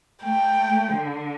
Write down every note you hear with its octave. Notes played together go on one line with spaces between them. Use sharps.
A3 G5
D3